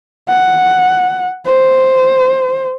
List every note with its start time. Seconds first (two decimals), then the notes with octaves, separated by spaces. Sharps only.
0.29 F#5
1.46 C5